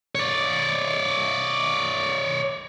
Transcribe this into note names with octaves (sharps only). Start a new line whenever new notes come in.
C#5 D5